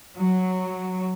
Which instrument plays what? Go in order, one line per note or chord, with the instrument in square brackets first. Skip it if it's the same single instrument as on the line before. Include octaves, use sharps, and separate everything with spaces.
[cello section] F#3